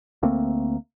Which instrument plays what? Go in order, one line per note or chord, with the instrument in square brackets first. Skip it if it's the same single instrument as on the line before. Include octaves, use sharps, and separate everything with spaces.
[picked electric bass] D2 A3 A#3 C4